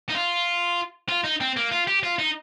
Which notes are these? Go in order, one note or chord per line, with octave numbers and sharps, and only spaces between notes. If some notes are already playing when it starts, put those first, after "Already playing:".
D#4
F4
F4
D#4
C4
A#3
F4
G4
F4
D#4